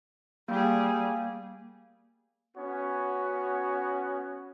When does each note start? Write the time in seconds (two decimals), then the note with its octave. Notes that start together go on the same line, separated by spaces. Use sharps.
0.48 G3 A#3 G#4
2.56 B3 C#4 F#4 C#5